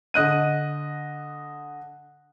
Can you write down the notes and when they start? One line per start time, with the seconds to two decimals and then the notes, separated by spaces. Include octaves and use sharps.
0.14 D3 D#5 F#6 D#7